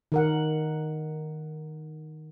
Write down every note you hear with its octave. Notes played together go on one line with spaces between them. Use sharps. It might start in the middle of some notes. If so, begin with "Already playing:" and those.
D#3 A#4 F#5